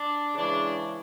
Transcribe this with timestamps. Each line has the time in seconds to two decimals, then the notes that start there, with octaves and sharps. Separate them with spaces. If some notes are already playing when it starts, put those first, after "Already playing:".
Already playing: D4
0.35 C#3 E3 G#3 D4